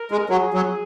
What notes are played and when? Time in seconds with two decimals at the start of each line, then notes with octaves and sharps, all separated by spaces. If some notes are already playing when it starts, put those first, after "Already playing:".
Already playing: A#4
0.11 G#3
0.30 F#3 G#4
0.54 F#3